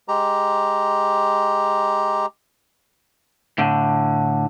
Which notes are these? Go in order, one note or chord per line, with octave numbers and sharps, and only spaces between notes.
G#3 G4 A#5
A2 D3